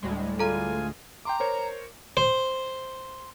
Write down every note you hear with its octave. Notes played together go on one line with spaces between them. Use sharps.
D2 A2 G3 G#3
F4 A4 G#5 A#5
G5 A#5 C6 D6
A#4 C5 C#5
C5